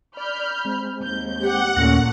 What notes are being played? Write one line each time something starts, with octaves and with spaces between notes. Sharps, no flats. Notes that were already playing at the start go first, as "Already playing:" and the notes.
D5 B5 F6 G6
G#3 C4
D#2 G6
G4 F#5
D#2 A#2 A3 A#3 C#4 A#6